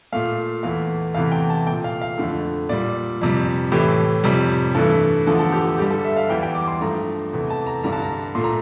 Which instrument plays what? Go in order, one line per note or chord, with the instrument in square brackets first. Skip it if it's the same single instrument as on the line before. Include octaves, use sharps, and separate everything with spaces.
[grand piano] A#2 A3 F5
E2 E3 A3 F5
E2 C3 E3 A3 F5
G5
A5
A3 G5
A#2
F5
F5
F2 D3 A3
A#2 G3 D5
F2 C3 G3
A2 E3 A3 G4
F2 C3 G3
G2 E3 A3 A4
E2 D3 F3 A3 A4
A4
G4
A4
G2 D3 G3 G4
A4
E5
F5
E2 E3 G3 G5
G5
D6
C6
G2 F3 A3 A#5
E2 C3 E3 A3
A5
A#5
G2 D3 G3 A#5
A5
A#5
A#2 A3 C6
A#5